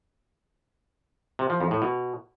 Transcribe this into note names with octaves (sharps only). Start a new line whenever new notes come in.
C3
F3
F2
A2
B2